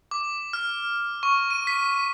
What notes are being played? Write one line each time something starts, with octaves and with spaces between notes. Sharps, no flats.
D6
F6
C#6
D#7
B6